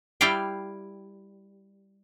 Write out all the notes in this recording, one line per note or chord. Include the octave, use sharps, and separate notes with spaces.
G3 E4 D5 F5 G5